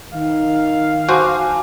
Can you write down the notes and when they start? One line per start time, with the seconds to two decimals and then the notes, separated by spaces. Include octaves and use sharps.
0.13 D#3 F5
1.09 F#4 C5 G#5 A5 D6